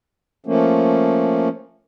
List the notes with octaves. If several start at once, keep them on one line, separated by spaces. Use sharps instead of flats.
F3 A3 A#3 C#4